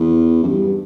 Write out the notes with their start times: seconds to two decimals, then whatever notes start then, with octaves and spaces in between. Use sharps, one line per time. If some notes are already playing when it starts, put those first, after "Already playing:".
Already playing: E2
0.43 F#2
0.47 G2